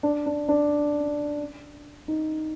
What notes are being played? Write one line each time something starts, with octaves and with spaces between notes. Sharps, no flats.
D4
D4
D4
D#4